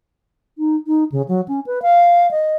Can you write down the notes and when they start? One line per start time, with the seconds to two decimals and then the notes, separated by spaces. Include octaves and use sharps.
0.58 D#4
0.87 D#4
1.12 C#3
1.29 F#3
1.48 C#4
1.66 B4
1.82 F5
2.31 D#5